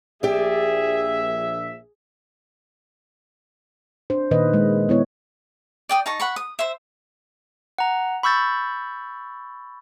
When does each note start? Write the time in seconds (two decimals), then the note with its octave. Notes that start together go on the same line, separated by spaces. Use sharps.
0.23 A#1 G4 G#4 D5 E5
4.10 D4 C5
4.31 A#2 D#3 B4 D#5
4.53 G#3
4.89 B3 E4 C#5
5.89 D5 G5 D#6
6.06 D#4 A5 C#6
6.20 F#5 B5 C#6
6.36 D#6
6.59 C5 E5
7.78 F#5 A#5
8.23 B5 C#6 E6 G6 A6